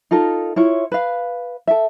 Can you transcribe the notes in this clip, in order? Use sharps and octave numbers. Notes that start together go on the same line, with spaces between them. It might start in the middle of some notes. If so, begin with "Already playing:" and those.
D#4 F4 A4 A#4
E4 F4 C#5
B4 F5
A4 E5